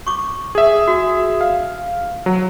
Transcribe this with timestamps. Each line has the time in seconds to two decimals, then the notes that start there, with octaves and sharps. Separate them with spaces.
0.07 C#6 D6
0.55 G#4 E5
0.88 F#4
1.41 F5
2.26 F#3